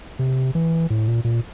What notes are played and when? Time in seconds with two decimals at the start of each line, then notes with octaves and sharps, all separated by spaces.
0.19 C3
0.55 E3
0.90 A2
1.08 A#2
1.25 A#2